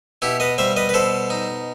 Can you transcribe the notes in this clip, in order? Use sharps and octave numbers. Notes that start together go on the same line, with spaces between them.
B2 E4 G4
B4 D#5
G3 C5 E5
B4 D#5
B4
B2 A4 C5
D#4